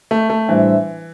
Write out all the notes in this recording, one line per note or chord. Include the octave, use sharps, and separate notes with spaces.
A3
A3
A2 E3 G3 D4 C5 E5